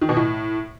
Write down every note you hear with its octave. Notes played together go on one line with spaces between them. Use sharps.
D#3
B2
A2